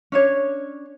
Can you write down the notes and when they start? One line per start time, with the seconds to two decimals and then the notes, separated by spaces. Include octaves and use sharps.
0.12 C#4 D4 C#5